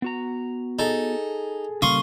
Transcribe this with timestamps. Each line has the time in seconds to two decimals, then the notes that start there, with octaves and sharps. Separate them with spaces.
0.02 B3 F#4 A#5
0.79 D#4 G#4 A4
1.82 C#3 G3 A#3 F5 C6 C#6 D#6